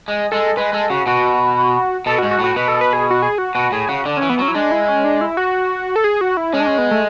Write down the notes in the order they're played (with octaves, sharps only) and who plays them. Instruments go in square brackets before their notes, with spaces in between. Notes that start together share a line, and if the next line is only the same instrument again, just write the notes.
[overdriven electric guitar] G#3
[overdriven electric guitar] G#3 [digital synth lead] A4
[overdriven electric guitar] G#3 [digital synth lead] B4
[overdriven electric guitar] G#3 [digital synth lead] A4
[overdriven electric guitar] C#3 [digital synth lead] F#4
[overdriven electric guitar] B2 [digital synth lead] F#4
[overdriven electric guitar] B2 [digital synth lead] A4
[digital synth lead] F#4
[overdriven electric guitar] G#2
[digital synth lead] F#4
[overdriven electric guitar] A2
[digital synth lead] F#4
[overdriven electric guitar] B2 [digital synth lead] B4
[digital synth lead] A4
B4
G#4
F#4
G#4
F#4
[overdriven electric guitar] B2 [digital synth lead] F#4
[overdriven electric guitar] A2 [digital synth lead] G#4
[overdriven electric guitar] C#3 [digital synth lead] F#4
[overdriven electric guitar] D3 [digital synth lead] D4
[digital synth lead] C#4
[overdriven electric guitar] E3
[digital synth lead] B3
[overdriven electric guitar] F#3 [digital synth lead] C#4
[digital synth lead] E4
[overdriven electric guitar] G#3 [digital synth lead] D4
[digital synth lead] E4
C#4
D4
E4
F#4
A4
G#4
F#4
E4
[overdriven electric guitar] G#3 [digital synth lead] C#4
[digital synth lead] D4
C#4
B3
A3